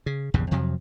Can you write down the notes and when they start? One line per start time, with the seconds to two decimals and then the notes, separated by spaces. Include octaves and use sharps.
0.06 C#3
0.34 A#1 E2 G2 C#3
0.51 F2 C3 F3 F#3